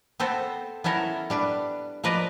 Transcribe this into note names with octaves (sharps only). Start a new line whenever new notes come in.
B3 C4 A4 C5
B3 C#4 E4 A4 A#4
G3 D4 B4
F3 A#4 B4 D5 D#5